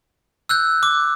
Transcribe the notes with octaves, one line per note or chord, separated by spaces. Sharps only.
E6 F#6 G6
D6